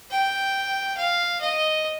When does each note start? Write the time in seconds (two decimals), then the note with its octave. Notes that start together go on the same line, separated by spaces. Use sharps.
0.11 G5
0.97 F5
1.40 D#5